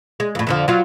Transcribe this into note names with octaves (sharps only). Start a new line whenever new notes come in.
G#3
F2 A2
F2 D3 F3
F#3 F4